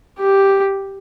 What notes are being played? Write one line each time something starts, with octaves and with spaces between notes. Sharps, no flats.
G4